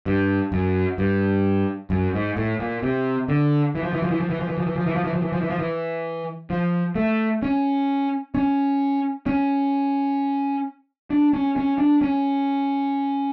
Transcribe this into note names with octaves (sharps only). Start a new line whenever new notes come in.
G2
F#2
G2
F#2
G#2
A2
A#2
C3
D3
E3
F3
E3
F3
E3
F3
E3
F3
E3
F3
E3
F3
E3
F3
E3
F3
E3
F3
E3
F3
E3
F3
A3
C#4
C#4
C#4
D4
C#4
C#4
D4
C#4